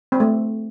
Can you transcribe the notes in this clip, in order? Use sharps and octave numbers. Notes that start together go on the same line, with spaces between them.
C4
A3